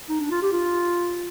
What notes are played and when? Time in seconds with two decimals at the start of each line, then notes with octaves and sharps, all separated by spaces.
0.09 D#4
0.20 D4
0.31 F4
0.42 G4
0.53 F4